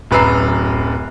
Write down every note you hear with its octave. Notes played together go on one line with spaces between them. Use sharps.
D1 F#2 B4 A#5 E6 C7